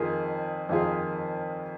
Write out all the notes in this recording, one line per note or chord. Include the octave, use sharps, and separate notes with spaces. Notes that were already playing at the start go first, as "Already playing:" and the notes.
Already playing: F2 D#3 A#3 F4 G#4
F2 D#3 A#3 F4 G#4